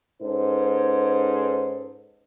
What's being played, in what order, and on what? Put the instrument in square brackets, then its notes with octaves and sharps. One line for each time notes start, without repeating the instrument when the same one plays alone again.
[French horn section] G#2 C#4 D#4 A4 B4 C5